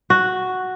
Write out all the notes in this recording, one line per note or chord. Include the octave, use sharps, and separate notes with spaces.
F#4